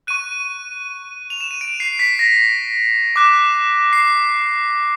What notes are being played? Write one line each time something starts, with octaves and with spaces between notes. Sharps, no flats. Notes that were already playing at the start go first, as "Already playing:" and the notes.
C#6 F#6 D#7
F7
E7
D#7
D7
C7
B6
A#6
D6 F#6
C7